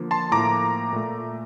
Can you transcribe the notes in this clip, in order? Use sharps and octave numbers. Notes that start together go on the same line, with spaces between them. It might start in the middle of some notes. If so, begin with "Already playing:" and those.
Already playing: D3 F3 A#3
A5 C6
A2 F3 A#3 A#5 D6
A#2 A3